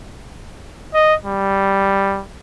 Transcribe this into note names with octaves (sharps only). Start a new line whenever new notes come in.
D#5
G3